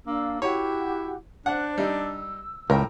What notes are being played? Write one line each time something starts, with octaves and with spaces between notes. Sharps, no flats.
A#3 D4 F5 E6
E4 F#4 G4 C#5 F#5
D4 C5 F#5 F#6
G3 D#4 E6
C#2 A2 A#4 G5